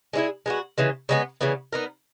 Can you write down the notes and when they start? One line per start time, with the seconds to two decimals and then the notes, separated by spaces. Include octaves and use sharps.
0.13 G#3 C#4 E4 G#4
0.46 G#3 B3 F#4
0.78 C#3 E3 G#3
1.09 C#3 G#3 B3
1.41 C#3 E3 B3
1.72 B3 D#4 A#4